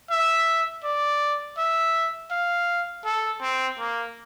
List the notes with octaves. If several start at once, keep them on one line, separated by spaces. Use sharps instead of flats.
E5
D5
E5
F5
A4
C4
A#3